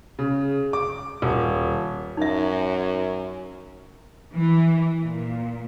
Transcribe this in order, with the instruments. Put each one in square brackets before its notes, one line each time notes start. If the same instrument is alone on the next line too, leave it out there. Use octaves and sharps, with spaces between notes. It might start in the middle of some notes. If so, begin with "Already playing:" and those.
[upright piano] C#3
D6
D#1
[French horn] F#2 [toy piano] D#4 E5
[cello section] E3
A#2